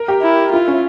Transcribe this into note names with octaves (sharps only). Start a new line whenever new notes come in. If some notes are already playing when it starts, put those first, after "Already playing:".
Already playing: A#4
G4
E4
E4 F4
C#4